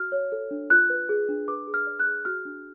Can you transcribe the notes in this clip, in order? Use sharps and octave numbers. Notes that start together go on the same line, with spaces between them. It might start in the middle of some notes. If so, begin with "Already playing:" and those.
Already playing: F#4 F6
C#5
A4
D4
F4 F#6
B4
G#4
D4
B4 D6
G#4
F6
D5
F#6
G#4
F#4 F6
D4